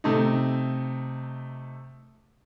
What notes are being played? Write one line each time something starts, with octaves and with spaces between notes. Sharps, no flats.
C3 A3 D#4